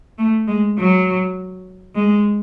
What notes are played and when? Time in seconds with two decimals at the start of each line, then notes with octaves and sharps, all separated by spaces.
0.18 A3
0.47 G#3
0.78 F#3
1.95 G#3